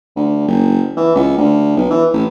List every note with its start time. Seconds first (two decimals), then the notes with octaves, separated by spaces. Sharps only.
0.16 D2
0.48 F#1
0.97 E3
1.15 C#2
1.38 D2
1.77 B1
1.90 E3
2.13 A1